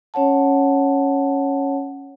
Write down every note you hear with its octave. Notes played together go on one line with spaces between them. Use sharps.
C#4 C#5 F#5 A5